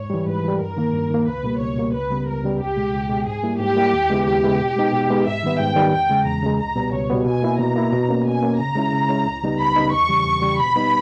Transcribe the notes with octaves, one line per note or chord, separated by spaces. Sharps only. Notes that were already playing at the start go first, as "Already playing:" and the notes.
Already playing: G#2 C#5
E3 G3
G#2 B4
E3 G3
G2 A#4
D#3 A#3
G2
D#3 A#3
C#2 B4
B2 G3 A#3
C#2 C#5
B2 G3 A#3
C#2 B4
C#3 G3 B3
C#2 A#4
C#3 G3 B3
C#2 G4
B2 G#3
C#2
B2 G#3
G#2 G#4
G3 A#3 E4
G#2 G4
G3 A#3 E4
D#2
C#3 G#3 B3 E4
D#2 G4
C#3 G#3 B3 E4
B2
G#3 B3 D#4
B2
G#3 B3 D#4
G#2 E5
D#3 G3 B3
G#2 G5
D#3 G3 B3
E2 G5
C#3 G#3
E2 A#5
C#3 G#3
C#2 A#5
B2 G3 B3
C#2 C#5
B2 G3 B3
B2 G#5
A#3 E4
B2 A#5
A#3 E4
B2
A#3 C#4
B2 G#5
A#3 C#4
C#3 A#5
G#3 C#4 E4
C#3
G#3 C#4 E4
C#2
C#3 G3 B3 D#4
C#2 B5
C#3 G3 B3 D#4
E2 C#6
C#3 E3 G3
E2
C#3 E3 G3
B2 B5
G3 B3 D#4